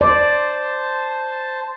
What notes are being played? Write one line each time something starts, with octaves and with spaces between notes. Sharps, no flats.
C5 D5 A5